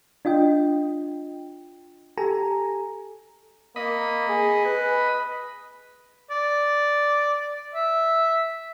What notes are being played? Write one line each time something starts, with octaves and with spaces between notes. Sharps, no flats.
D4 F4 D#5 G5
G4 A4 G#5 A#5
A#3 D#5 B5
G#4
B4
D5
E5